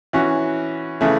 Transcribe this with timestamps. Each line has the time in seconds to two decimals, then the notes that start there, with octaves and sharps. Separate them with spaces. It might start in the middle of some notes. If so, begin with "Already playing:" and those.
0.13 E3 C#4 F#4
1.01 C#3 E3 A3